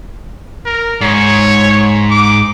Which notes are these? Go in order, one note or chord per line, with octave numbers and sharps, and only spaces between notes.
A#4
G#2 C#5
D6